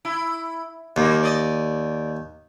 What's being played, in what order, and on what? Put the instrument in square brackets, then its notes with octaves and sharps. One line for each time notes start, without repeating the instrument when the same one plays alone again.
[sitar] E4
[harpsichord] D#2 [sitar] G3 A#3 F#4
[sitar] D5 D#5